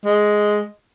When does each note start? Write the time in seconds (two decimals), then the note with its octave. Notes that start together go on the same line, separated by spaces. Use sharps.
0.05 G#3